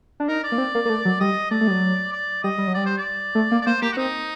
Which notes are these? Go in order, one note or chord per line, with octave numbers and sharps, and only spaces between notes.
D4
D#4 A#4
D5
A#3
C4
A#3
A#3
A3
F#3
G3 D#5
A3 D5
A3
G3
F#3
D5
G3 D#5
G3
F#3
G3 D5
C5
D5
A3
A#3
D5
A#3 C5
A#3 G4
F#4
C4 D#4